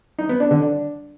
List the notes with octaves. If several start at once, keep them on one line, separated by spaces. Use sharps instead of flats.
D#4
B3
D4
D3
D4